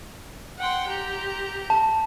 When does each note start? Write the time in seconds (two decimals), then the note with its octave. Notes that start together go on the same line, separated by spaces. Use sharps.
0.58 F#5 G5 C6
0.87 G4 A#5
1.70 A5